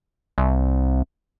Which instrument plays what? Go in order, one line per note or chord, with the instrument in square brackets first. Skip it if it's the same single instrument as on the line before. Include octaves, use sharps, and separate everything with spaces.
[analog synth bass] C2